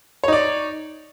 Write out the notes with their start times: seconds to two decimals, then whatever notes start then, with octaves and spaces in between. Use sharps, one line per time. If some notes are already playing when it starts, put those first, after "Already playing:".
0.24 C#5
0.28 D#4
0.33 D5